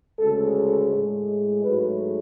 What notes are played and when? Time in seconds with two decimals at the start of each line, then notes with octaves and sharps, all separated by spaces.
0.19 D2 C#3 G#3 A4
0.55 A4
0.91 A2 G#3
1.63 G#2 F#3 A3 B4